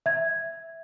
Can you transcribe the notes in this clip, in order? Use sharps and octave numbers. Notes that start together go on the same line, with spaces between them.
E5 G#6